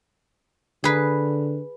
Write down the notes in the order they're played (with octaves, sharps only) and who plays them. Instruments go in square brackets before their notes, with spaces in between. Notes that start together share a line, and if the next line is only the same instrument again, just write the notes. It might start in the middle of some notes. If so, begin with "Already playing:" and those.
[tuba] D3 [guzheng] G#4 B4